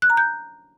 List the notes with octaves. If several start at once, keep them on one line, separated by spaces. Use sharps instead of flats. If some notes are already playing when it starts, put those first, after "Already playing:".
F#6
A#5
G6